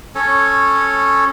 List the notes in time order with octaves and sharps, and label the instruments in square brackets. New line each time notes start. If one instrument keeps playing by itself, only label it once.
[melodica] C#4 A4 C#5